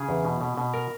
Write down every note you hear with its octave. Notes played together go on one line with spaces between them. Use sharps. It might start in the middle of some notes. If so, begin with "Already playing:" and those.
Already playing: C#3 G#4
E2
B2
B2
B2
A#4